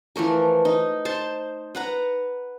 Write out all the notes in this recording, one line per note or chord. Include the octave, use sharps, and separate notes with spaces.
E3 F3 A3 A#4
D#4
C5 A5
B4 F#5 A#5